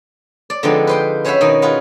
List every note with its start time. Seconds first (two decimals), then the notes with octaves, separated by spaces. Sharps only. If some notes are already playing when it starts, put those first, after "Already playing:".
0.50 D5
0.63 D3 F3 G#3 B3 C4 D#4
0.87 B4 C5 G5
1.24 C#4 C5 C#5 E5 F#5 B5
1.41 B2 D#3 D#4
1.62 F4 G#4 B4 F#5